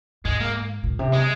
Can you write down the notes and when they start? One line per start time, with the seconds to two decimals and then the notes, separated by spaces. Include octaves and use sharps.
0.25 G#2 G#3
0.40 A#3
0.84 A#2
0.99 C3
1.13 G#3